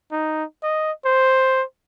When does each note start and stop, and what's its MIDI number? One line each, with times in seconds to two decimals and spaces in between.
0.12 0.44 63
0.63 0.92 75
1.06 1.63 72